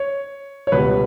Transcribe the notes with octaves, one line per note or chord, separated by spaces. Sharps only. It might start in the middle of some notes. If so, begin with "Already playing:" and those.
Already playing: C#5
C#5
C#2 B2 G3 B4